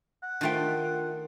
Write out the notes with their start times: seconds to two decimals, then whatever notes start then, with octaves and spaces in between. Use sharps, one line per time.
0.23 F#5
0.41 D#3 A3 D4 F4 G5